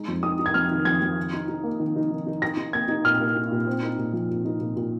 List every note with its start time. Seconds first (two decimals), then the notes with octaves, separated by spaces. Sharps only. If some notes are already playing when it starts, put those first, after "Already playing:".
Already playing: G#3 D#4
0.08 F2
0.23 D#4 D#6
0.39 D#4
0.46 G#6
0.54 F2 F6
0.71 D#3
0.85 F2 G#6
1.02 F2
1.17 D#3
1.33 D#4
1.49 D#4
1.64 A#3
1.80 D#3
1.96 D#4
2.11 D#3
2.26 D#4
2.42 D#4 A#6
2.57 D#4
2.73 A#3 G#6
2.88 D#4
3.05 A#2 F6
3.20 A#3
3.36 D#4
3.52 A#2
3.67 C4
3.83 D#4
3.99 A#2
4.13 F3
4.30 A#2
4.45 D#4
4.60 A#2
4.76 A#2